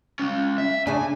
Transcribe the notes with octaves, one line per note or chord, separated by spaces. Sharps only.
G#3 C#4
E5
C#3 D4 G#5